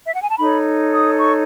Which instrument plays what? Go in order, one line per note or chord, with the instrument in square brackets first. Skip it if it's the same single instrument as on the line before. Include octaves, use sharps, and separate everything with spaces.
[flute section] E5
F#5
G#5
A5
D#4 A4 C#5 B5
D#6
C#6